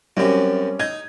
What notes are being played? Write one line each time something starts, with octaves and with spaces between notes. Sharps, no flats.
F#2 C3 G3 C#4
D#4 G#6